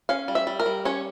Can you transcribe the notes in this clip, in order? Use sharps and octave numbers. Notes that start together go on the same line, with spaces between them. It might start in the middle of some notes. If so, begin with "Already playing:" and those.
C#4 F5
G3
E5
G3
A#4
G3
C#4 C#5